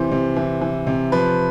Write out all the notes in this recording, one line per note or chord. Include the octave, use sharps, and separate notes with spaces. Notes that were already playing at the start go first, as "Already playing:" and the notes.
Already playing: C3 E3 C5
C3
E3
E3
C3
F3 B4